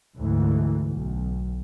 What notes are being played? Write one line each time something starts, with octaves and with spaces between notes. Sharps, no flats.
D2 G#2 E3
B1